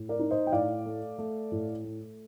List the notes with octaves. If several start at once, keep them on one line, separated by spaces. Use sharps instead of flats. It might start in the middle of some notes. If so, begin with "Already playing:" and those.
Already playing: A2
A#4 D5
D#4
C5 D#5
G5
A2 D5 F5
A3
A3
A2
A3